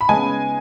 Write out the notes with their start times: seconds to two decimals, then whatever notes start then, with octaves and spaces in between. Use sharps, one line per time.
0.01 B5
0.09 C#3 G#3 B3 G#5